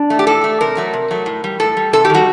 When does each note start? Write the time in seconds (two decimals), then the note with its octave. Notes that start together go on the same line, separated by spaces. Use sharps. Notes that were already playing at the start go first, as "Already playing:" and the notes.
Already playing: D4
0.10 A3
0.19 G4
0.27 A2 A4
0.44 A3
0.61 C3 A#4
0.77 F#3 A3
0.93 C3
1.11 F#3 A3
1.26 A2
1.44 G3
1.60 A2 A4
1.77 G3
1.93 C3 A4
2.05 G4
2.10 D#3 G3 F#4